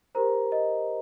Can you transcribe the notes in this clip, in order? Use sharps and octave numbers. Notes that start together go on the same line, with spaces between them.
G4 A#4 C5 A#5
D#5